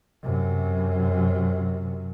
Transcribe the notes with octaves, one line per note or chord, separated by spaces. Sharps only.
F#2 C3